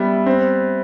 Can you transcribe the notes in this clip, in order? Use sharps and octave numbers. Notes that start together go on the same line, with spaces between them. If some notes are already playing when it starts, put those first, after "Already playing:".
Already playing: G3 B3 E5
C4